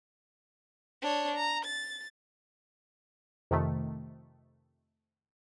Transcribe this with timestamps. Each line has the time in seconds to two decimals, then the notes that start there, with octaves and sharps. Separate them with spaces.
1.02 D4 C#5
1.36 A#5
1.65 A6
3.51 F2 C3 D#3 A3